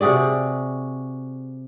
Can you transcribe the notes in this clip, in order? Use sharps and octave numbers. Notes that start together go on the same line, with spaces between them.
C3 F#4 G#4 D5